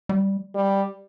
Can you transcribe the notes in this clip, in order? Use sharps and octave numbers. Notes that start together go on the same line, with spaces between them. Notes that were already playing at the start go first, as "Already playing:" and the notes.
G3
G3